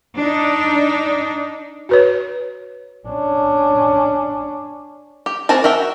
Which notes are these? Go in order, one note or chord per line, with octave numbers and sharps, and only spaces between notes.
D4 D#4
F#4 B4 C#5
C#4 D4
G4
C4 F#4 A#4 G#5 A5
F#4 A#4 E5 G5